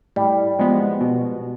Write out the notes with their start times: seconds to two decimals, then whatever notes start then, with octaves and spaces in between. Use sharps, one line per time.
0.16 A2 G3
0.58 F3 G#3 B3
1.01 B2